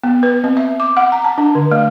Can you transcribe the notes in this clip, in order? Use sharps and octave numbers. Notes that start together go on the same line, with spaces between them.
B3
B4
C4
E5
D6
F#5
A#5
A5
D4
D3
A3